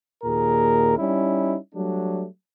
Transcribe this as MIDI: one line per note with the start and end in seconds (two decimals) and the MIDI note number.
0.24 0.95 39
0.24 0.95 46
0.24 0.95 68
0.24 0.95 70
0.97 1.56 55
0.97 1.56 61
0.97 1.56 63
0.97 1.56 64
1.74 2.24 54
1.74 2.24 55
1.74 2.24 57
1.74 2.24 62